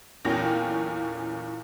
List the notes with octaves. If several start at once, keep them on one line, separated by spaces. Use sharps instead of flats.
B1 E2 A#2 C#4 G5 A#6